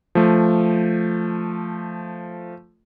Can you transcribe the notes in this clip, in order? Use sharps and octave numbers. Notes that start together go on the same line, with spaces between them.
F3 A3